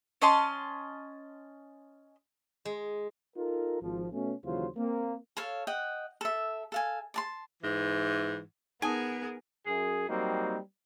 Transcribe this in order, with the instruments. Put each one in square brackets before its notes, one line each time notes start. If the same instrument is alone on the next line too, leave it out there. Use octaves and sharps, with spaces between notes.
[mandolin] C#4 D#5 A5 C6
[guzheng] G#3
[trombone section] D#4 F4 A4 A#4
G#1 F3
B2 A3 C#4
D#2 C#3 E3 F#3 F4 C5
A#3 C4
[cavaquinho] A4 C#5 F5
D#5 F#5 G5
A4 E5
A4 F5 G#5
D5 A5 C6
[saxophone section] G#2 E3
[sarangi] B3 [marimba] D#4 A5 D#6 [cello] G#4 A#4 [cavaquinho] G#5
[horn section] F#2 G#4
F#3 G3 A#3 C4 D#4